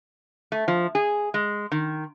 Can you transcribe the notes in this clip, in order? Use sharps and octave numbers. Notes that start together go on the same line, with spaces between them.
A3
F3
G#4
G#3
D#3